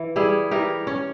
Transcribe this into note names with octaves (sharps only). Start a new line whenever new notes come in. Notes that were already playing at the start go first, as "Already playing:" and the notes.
Already playing: E3
G3 E4 G#4
E3 G4 A#4
C#4